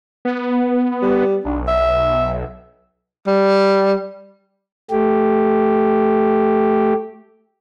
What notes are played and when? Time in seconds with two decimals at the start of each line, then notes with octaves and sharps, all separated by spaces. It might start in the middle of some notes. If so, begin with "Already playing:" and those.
0.25 B3
1.02 G3
1.45 B1 D4
1.68 E5
3.27 G3
4.91 A3 G4